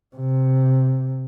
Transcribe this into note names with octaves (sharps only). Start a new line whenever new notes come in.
C3